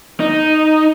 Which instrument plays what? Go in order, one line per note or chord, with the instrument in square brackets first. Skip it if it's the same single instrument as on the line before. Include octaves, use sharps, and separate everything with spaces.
[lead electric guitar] D#4